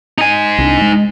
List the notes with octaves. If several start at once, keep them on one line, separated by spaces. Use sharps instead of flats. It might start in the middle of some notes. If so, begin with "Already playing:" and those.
D#4 G#5
C2 D4
G#3